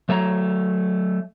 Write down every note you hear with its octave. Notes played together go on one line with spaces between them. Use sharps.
F#3 A3 C#5 A#5